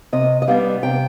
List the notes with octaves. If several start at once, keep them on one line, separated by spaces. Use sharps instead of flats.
C3 D#5
D#5
G3 B3 D4 F5
C3 G5